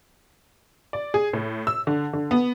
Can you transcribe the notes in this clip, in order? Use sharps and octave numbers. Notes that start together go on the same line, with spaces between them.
D5
G#4
A2
E6
D3
D3
B3